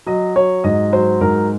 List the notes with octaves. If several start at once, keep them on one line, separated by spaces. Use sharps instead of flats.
F#3 D#5
F#3 C#5
G#2 D#5
F#3 C5
G#2 A#4